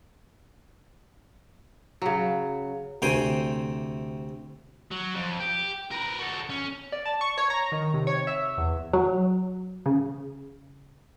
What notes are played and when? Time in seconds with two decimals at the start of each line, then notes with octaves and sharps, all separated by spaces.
2.02 C#3 F#3
3.02 D2 C3 C5 G5 G#5 C6
4.92 F#3
5.15 F2
5.40 G4
5.91 A#4 B4
6.19 F#4 A4
6.50 C#4
6.92 D5
7.06 A5
7.21 C#6
7.38 C#5
7.50 A#5
7.72 D#3
7.94 C3
8.07 C#5
8.27 E5
8.58 E2
8.93 F#3
9.86 C#3